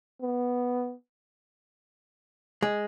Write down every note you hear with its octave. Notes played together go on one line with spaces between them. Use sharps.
B3
G#3